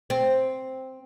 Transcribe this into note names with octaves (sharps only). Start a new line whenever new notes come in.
C4